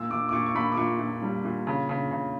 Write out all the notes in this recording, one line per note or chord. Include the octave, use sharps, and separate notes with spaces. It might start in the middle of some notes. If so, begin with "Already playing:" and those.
Already playing: A#2 E6
A#2 D6
D6
A#2 C#6
C#6
A#2 B5
D6
A#2 C#6
A#2
G3
A#2
C#3
C#3
C#3